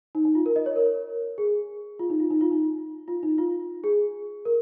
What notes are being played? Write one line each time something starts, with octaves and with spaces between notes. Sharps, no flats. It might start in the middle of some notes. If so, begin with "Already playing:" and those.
D#4
D#4
F4
A#4
D#5
C#5
A#4
G#4
F4
D#4
F4
D#4
F4
D#4
F4
D#4
F4
G#4
A#4